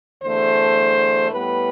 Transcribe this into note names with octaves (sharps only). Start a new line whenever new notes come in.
E2 D3 A3 C5
A2 G3 B3 B4